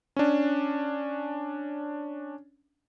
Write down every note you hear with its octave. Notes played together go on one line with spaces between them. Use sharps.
C#4 D4